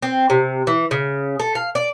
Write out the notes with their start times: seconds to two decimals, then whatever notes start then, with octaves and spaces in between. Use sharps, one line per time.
0.02 C4
0.30 C3
0.67 E3
0.91 C#3
1.40 A4
1.55 F5
1.75 D5